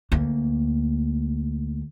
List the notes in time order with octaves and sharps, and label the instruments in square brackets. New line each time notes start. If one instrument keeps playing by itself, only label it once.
[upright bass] D2 A#3